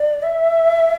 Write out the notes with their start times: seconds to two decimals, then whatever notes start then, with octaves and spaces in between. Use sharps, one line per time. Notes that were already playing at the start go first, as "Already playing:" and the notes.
Already playing: D5
0.23 E5